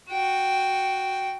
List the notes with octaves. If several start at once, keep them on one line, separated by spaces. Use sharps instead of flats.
F#4 G5